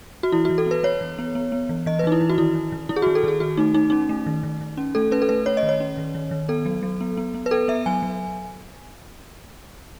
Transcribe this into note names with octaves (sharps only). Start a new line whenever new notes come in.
F#4
E3 E4
F#4
E3
A4
B3 B4
B3 C#5
E3
B3
B3
B3
E3
E3 D#5
B4
E3 D#4
E4
E3
F#4
D#3 E4
D#3
D#3
D#3 E4
G#4
F#4
D#3
A4
D#3 G#4
D#3 F#4
A3 D#4
A3 D#4
C#4 D#4
A3
D#3
D#3
D#3
C#4
A3 A4
C#4 B4
A4
A3 B4
C#4 C#5
D#5
D#3
C#5
C#4
D#3
D#3
D#3
B3 A4
F#3
F#3
B3
B3
B3
B4
B3 A4
B3 E5
F#3 G#5
F#3